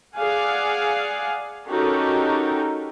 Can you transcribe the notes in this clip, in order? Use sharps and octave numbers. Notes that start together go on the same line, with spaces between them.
G#4 D5 F5 F#5 G#5
C#4 D#4 F#4 G4 A4 A#4